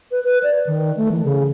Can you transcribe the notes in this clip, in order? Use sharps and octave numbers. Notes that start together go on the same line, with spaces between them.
B4
B4
D5
D#3
A3
E3
C#3